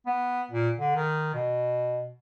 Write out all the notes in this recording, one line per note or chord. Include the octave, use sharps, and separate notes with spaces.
B3
A#2
D3
D#3
B2